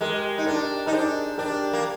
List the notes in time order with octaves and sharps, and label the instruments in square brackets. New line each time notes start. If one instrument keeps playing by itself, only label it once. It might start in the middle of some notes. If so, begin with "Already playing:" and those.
[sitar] G#3 [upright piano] G4 A#4
[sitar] D#4
[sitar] D4 [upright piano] G4 A#4
[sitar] D#4 [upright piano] A#4
[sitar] D4 [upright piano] G#4 C5
[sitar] D4 [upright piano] G4 A#4
[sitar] A#3